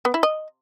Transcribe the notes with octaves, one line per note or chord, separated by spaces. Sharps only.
B3
E4
D#5